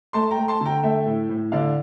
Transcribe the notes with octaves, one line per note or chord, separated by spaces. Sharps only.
A3 A5 C6
G5 A#5
A3
A5 C6
D3 G5 A#5
A3 E5 G5
A2
A2
D3 D5 F5